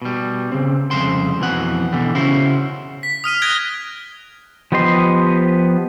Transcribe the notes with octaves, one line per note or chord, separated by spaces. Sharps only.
B2 G3
C#3 C4
C2 F2 C#3 G#3 C5 C6
F2 B2 E3 F#5
B2 D3 E3 G3
C#3 C#4 E4 F#4 C5
B6
D#6 F6 D#7 F7
F#6 G#6 A#6 D7 G7
F3 B3 G4 D#5 C6